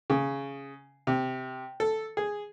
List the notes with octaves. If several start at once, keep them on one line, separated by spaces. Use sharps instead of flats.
C#3
C3
A4
G#4